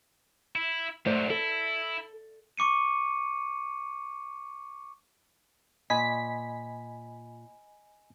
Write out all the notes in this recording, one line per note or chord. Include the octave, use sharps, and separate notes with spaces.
E4
G#2 F#3 A3 C5 D5
E4 A4
C#6 D6 C#7 D#7
A#2 D#5 G#5 B5 B6